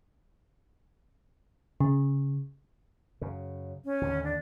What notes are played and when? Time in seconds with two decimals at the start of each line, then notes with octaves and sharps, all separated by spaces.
1.80 C#3
3.21 F#2 C#3
3.85 C#4
4.01 D#2 A2 D3
4.24 D4